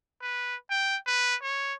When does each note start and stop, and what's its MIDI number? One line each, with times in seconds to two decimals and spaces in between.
0.22 0.56 71
0.70 0.97 79
1.06 1.36 71
1.42 1.74 73